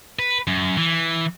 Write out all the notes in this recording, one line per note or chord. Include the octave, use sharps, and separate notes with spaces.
B4
F#2
E3